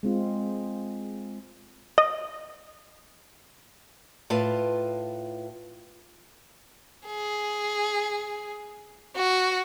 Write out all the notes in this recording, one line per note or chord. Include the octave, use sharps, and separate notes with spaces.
G#3 C4 F4
D#5
A2 F4 B4 A5
G#4
F#4